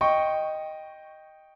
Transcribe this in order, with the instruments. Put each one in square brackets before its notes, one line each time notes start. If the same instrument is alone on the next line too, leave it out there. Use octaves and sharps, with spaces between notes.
[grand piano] D#5 G5 C#6